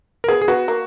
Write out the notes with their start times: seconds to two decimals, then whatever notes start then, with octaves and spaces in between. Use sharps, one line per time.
0.24 A#4
0.28 B3 G#4
0.42 G#4
0.48 B3 F#4
0.68 A#3